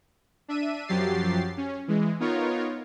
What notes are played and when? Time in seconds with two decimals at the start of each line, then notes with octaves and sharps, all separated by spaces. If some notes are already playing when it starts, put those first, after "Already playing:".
0.48 D4 E5 D#7
0.88 F#2 F3 F#3 G4 A6 C7
1.57 C#4
1.88 E3 G#3
2.20 B3 D#4 F4 A#4 C#5